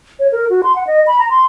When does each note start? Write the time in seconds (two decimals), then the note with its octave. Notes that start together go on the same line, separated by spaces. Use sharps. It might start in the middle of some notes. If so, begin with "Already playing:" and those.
0.19 C#5
0.32 A#4
0.50 F#4
0.63 C6
0.76 F#5
0.87 D#5
1.07 B5
1.19 A#5
1.30 C6